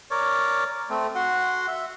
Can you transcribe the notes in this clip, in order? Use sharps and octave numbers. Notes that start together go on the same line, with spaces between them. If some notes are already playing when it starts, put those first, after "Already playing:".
A#4 C#5 D5
A3 C4
F#4 F#5 C6
E5